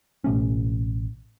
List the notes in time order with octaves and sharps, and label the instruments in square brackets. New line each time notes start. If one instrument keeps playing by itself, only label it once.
[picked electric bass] A1 B2 A3 C#4